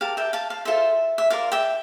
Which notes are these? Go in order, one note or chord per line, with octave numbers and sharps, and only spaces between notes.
G4 A#4 D5 F5 A5
E5 G5
F5 A5
F5
F4 A4 C5 E5
E5
F4 A#4 D5 F5
E5 G5